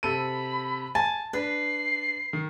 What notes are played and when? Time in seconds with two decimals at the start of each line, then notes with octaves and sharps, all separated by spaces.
0.03 C3 A4 B5 D#7
0.95 G#5 A5
1.33 D4 B4 C7
2.33 D#3